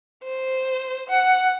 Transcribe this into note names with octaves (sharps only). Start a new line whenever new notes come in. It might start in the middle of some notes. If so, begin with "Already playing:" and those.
C5
F#5